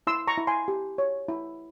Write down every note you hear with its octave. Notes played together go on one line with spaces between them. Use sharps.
E4 C6 E6
A#5 C#6
E4
G#5 C6
G4
C#5
E4